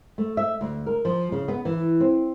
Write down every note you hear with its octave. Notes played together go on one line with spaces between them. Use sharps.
A3
E5
D2
A#4
F3
C#3
B3
E3
C4